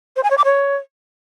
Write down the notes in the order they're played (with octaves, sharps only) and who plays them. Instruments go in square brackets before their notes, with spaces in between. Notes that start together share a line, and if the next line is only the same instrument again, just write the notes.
[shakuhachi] C5
G#5
C#5
D6
C#5